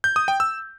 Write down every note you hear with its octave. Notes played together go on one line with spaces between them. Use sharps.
G6
D#6
G5
E6